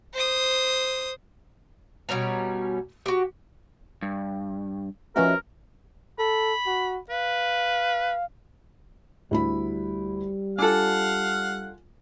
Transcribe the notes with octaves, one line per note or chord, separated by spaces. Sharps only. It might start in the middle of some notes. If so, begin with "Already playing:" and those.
C5 D#6
B2 G3 C#4 A#5
F#4 G4
G2
F3 C#4 F#4 A#4 B4 D#5 E5
A4 B5
F#4
B4 F5
D2 G3 E4 B5
D4 F4 A4 F5 F#5 G#5